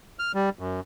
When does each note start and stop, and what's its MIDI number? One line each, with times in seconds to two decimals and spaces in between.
0.19 0.32 89
0.35 0.49 55
0.59 0.80 42